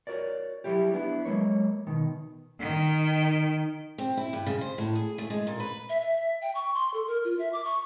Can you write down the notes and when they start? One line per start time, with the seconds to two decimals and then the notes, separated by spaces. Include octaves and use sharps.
0.07 F#4 A#4 C#5 D5
0.64 F#3 G3 E4 G4
0.94 B3 D4 E4
1.25 F#3 G#3 A#3 C#5
1.87 B2 D#3
2.60 D#3 G5
3.98 C4
4.17 E4
4.33 G2
4.47 C#3
4.61 C5
4.78 A2
4.95 G#4
5.18 A3
5.30 G#3
5.47 A#2
5.60 B4
5.89 E5
6.01 E5
6.42 G5
6.55 C#6
6.74 C6
6.94 A4
7.07 A#4
7.25 F4
7.39 E5
7.53 D6
7.65 C#6